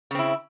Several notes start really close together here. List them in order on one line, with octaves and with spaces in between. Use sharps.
C#3 C4 E4